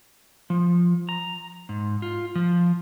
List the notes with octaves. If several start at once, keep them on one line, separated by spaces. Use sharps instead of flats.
F3
A#5
G#2
F4
F3